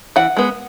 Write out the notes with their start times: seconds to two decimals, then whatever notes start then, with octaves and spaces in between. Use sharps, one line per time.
0.16 E3 F#5
0.37 G#3 B3